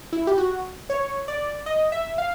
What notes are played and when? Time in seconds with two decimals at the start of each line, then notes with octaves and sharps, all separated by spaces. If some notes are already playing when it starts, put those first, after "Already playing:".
0.13 E4
0.27 G4
0.38 F#4
0.90 C#5
1.28 D5
1.66 D#5
1.92 E5
2.18 F5